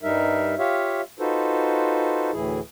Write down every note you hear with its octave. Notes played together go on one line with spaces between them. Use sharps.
G2 G3 D#4 A#4 E5
F4 G4 C#5 E5 F5
D#4 F4 F#4 A4 B4 C5
D2 A2 E3 E4 G#4